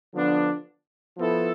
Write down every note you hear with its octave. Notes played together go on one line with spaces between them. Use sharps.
D3 F3 B3 D4
F3 B3 E4 A4